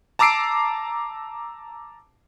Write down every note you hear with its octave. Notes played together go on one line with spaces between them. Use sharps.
A5 A#5 D6 E6 C7 D7